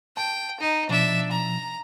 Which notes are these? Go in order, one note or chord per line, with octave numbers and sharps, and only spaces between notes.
G5 A5
D#4
B2 F3 D4 E5
A#5